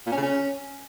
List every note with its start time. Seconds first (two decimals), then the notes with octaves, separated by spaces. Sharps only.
0.07 A#2
0.12 C#4
0.17 C#3
0.22 C#4